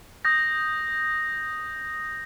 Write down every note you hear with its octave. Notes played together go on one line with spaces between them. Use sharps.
D#6 G6 A#6